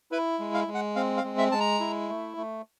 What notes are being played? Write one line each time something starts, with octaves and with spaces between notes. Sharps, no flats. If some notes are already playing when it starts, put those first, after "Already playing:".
E4 B4
G#3
F5
G#3
F#5
C4 F5
F5
G#3
E5
G#3 A5
A#5
E4
A3
A3